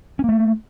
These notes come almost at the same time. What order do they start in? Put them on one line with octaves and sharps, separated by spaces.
C#4 A#3 A3